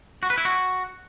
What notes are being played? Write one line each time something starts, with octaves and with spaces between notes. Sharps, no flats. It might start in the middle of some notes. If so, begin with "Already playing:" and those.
F#4
B4
E4
F#4